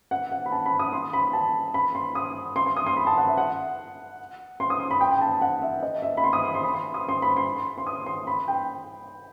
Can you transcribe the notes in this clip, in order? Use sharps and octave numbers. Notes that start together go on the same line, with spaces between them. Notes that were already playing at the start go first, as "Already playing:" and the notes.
F#5
F#5
B5
A5
B5
D#6
C6
B5
A5
B5
C6
D#6
C6
C6
D#6
C6
B5
A5
F#5
E5
F#5
C6
D#6
C6
B5
G5
G5
A5
F#5
E5
D#5
E5
B5
C6
D#6
C6
C6
B5
C6
D#6
C6
B5
C6
C6
D#6
C6
B5
G5